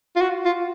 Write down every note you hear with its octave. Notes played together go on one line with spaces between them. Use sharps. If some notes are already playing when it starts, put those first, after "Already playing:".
F4
F#4
F4